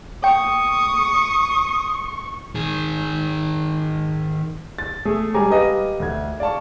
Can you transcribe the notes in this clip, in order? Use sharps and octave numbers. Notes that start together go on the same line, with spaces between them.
G5 C#6 D#6
D#3 G#4
A6
A3 G#4
G3 G#3 G#5 A#5 D6
G4 B4 D#5 F5
D2 G#6
D5 F5 A5 C#6